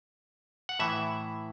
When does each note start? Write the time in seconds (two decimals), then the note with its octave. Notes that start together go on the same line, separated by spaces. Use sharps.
0.69 F#5
0.79 A2 E3 E5